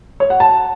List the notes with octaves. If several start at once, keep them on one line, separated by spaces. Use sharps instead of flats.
C#5
F#5
A5